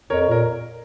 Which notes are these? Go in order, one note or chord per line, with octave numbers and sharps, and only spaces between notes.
F2 A#4 C#5
A#2 A#4